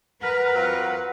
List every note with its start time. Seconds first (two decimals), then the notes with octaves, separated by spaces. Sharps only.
0.23 A#4 B4 F#5
0.55 F#3 C4 F4